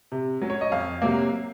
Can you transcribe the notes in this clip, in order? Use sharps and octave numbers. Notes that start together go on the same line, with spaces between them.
C3
F#3 C#4
C#5
D#5
F2 F5
C3 F#3 A#3